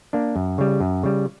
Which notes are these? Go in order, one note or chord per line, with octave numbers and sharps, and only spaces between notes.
A#3 D4
F#2
C#3 G3
F#2
C#3 G3